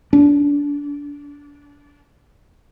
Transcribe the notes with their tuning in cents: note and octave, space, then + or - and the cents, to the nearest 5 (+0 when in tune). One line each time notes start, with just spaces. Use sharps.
D4 -25